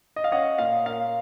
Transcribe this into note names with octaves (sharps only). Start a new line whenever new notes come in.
D#5
F5
C#4 D#5 F#5
A#2 F5
A#3 F5